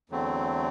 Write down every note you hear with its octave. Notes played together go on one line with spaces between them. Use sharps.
E2 D3 F#3 A3 C4